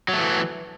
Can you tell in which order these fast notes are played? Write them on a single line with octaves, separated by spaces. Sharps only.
F#3 A3 E3